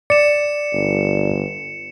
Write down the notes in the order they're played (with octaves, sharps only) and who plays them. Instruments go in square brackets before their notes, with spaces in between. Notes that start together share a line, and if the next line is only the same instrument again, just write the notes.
[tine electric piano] D5 [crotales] C#7 E7
[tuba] G1